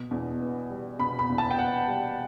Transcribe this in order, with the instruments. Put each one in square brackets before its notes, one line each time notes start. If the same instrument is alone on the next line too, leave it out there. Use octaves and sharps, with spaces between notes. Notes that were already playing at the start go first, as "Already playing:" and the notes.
Already playing: [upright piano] B2
E2
B3
G3
B2 B5
B5
E2
A5
G5
B3 F#5
G3